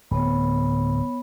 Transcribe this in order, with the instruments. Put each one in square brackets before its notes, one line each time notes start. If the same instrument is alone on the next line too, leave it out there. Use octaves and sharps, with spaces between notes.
[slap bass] D1 [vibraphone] B3 C#5 B5